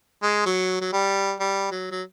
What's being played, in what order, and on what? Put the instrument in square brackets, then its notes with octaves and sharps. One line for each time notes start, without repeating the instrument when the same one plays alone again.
[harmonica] G#3
F#3
F#3
G3
G3
F#3
F#3